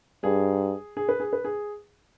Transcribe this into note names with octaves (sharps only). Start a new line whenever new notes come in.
G2 G#4
G#4
B4
G#4
B4
G#4